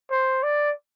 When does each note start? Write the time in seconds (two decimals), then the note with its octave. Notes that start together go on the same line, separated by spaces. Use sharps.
0.11 C5
0.43 D5